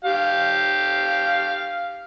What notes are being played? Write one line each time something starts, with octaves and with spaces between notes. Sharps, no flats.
G4 F5